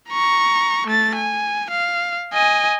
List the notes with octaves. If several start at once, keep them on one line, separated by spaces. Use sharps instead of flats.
A#5 C#6
A3 A6
G#5
F5
D#5 G#5